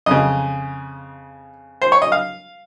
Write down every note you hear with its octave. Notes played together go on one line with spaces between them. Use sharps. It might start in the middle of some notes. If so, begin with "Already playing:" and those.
F2 C#3 D#5
C5
C#5
D#5
F5